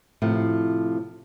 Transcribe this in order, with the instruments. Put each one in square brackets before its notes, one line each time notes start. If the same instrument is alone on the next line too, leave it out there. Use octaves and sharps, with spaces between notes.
[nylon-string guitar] A2 C3 F3